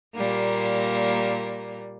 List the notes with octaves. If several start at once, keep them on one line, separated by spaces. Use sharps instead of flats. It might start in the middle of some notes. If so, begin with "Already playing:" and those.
A#2 G3 A#3